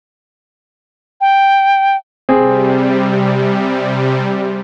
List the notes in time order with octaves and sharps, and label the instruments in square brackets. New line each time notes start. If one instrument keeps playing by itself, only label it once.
[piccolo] G5
[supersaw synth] C3 G3 [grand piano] C4 G#4